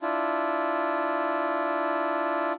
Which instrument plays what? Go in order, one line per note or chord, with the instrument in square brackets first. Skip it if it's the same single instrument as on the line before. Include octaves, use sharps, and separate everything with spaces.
[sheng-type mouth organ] D4 E4 F4